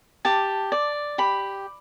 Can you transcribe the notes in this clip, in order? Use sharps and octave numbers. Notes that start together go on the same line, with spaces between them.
G4 A5
D5
G4 B5